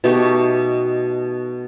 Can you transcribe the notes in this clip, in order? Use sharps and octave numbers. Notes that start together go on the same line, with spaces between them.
B2 A3 D#4 G4